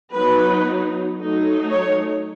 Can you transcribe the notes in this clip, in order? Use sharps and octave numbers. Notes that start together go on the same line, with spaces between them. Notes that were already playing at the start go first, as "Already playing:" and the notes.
F#3 B3 D#4 B4
F#3 A3 D#4
C#5